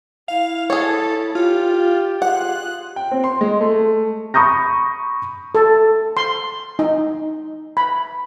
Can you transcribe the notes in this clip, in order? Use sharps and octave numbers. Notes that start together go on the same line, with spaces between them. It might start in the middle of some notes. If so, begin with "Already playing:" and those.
E4 F5
G#4 A4 C#5
F4 G4
F4 G#4 F#5 F#6
G5
C4
C6
G#3
A3
B5 C#6 D#6 G6 A#6
A4
C6
D#4
B5